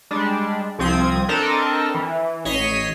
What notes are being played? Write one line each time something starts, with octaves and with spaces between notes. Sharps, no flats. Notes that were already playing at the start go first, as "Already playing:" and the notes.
G3 G#3 D4
C2 F3 C4 D#6 G#6
C4 D4 A4 A#4 D#5
E3
A1 C#5 D#5 B6 C7 D#7